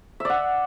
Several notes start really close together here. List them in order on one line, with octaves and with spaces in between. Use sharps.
E5 D5 F#5